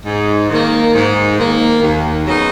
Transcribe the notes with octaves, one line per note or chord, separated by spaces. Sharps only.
G#2
D#3 A#3
G#2
D#3 A#3
D#2
C#3 F#3 B3 D#4